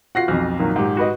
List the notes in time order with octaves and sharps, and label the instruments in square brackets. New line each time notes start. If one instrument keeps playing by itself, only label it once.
[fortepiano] F4 F#4 [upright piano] F#5 A#6 C7
[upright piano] B1 F2
[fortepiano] A#2 D#3 F#3
[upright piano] G#2 G4
[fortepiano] F#4 B4 D#5